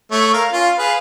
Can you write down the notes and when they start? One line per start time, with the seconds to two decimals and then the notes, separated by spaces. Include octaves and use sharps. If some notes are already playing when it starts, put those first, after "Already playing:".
0.12 A3 C#5
0.33 A#4 F5
0.52 C#4 F4
0.78 G#4 B4 F5